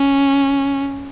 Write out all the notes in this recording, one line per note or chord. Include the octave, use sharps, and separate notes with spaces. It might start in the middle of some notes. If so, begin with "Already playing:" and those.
Already playing: C#4